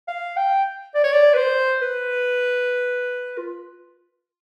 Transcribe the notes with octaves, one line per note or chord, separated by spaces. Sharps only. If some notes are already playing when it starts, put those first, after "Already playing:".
F5
G5
D5
C#5
D5
B4
C5
B4
F4